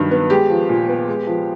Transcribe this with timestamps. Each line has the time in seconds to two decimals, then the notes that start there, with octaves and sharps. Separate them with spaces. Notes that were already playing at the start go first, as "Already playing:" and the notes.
Already playing: G2 D#3 F#3
0.11 B3
0.30 G#3 G4
0.50 F3
0.69 A#2
0.89 B3
1.08 G#3
1.27 F3